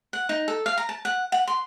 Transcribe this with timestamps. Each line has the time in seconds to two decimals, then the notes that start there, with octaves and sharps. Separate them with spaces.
0.13 F#5
0.29 D#4
0.48 A4
0.66 F5
0.78 A#5
0.89 A5
1.05 F#5
1.32 F#5
1.48 C6